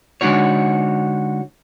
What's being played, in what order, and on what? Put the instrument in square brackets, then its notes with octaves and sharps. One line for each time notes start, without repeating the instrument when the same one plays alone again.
[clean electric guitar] D3 G#3 D4 D#4 F#4 C#5